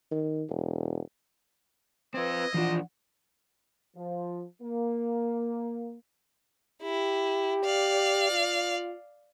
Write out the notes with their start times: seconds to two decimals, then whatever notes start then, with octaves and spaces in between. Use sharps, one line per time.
0.11 D#3
0.50 E1
2.14 C4 F4 B4 D#5 E6 G#6
2.54 E3 F3 D4 F4 F#5
3.97 F3
4.62 A#3
6.83 E4 G4
7.65 D5 F5
8.31 F4